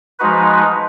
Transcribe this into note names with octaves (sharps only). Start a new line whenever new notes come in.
F3 G#3 D#4 F#4 B4